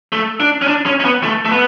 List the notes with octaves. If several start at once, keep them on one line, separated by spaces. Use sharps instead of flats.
A3
D4
C#4
D4
C#4
C#4
B3
A3
A3
B3